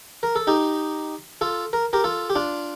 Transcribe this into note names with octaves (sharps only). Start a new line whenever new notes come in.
A#4
A4
D#4 G4
F4 A4
A#4
G4 A#4
F4 A4
G4
D4 F4